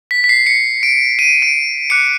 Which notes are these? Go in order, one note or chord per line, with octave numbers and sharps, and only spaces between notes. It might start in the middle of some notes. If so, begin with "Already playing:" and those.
B6
B6
C7
C#7
D7
D#7
D7
D6 F#6 C#7